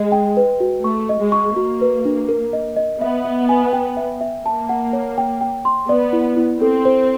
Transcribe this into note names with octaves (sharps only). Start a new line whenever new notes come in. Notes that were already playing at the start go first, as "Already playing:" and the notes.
Already playing: G#3 D#5
G5
B4
F#4
A3 C#6
D#5
G#3
C#6
A#3 F#4
B4
D4
A#4
D#5
D#5
B3 E5
E5
G#5
G5
E5
E5
A#3 A5
F#5
C#5
G5
G5
C6
B3 D5
E4
E4
C4 A4
C5